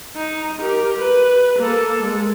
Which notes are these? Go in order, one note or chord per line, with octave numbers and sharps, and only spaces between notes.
D#4
G4 A#4
B4
A#3 A4
G#3